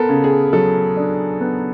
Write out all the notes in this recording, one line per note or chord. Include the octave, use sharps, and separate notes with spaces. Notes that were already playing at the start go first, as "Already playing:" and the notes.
Already playing: B3 A4 A#4
C#3
G#4
F#3 A4
D4
B3